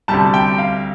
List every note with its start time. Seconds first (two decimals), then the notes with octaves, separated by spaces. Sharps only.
0.08 D2 C3 G3 A5
0.34 G5
0.58 F5